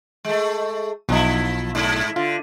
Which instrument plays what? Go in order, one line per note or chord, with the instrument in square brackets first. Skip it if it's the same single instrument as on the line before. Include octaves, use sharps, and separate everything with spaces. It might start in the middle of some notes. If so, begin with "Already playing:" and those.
[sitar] G#3 A3
[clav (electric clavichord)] B1 D#4 [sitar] F3 E4
[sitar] G#2 E4
[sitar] D3 [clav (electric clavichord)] F4